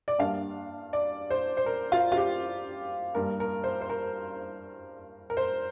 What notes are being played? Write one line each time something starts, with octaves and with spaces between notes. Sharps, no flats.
D5
G2 G3 A#3 D4 F5
D5
C5
C5
A#4
F4
F4
G4
G2 G3 A#3 A#4
A#4
C5
C5
A#4
A#4
C5